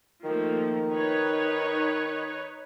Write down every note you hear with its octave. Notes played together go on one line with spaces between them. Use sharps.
D#3 F3 A3 A#3
D#4 B4 C#5